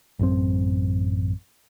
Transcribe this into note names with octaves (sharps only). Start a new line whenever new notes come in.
A1 F#2 C4